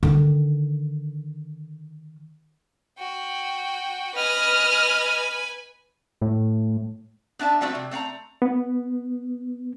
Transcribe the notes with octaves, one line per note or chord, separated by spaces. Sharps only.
D3 D#3
F#4 G5
B4 D#5 G#5 F6
A2
B3 D4 E5 A5
F3 G3 A3 C4 F#4 E5
C3
A3 C4 F5 A#5
B3